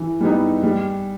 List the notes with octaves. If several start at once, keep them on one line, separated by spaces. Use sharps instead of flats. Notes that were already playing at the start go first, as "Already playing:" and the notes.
Already playing: E3
G3 B3 D#4
G3